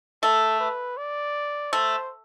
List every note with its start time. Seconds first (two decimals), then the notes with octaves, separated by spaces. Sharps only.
0.23 A3 A4
0.60 B4
0.97 D5
1.72 A3 C5